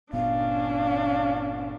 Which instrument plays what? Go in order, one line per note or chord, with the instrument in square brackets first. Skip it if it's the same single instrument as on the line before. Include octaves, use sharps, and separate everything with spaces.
[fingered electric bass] G1 A#2 B3 [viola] C#4 D4 [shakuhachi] F5